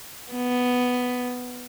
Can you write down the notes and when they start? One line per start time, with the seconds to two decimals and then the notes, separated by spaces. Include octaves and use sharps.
0.32 B3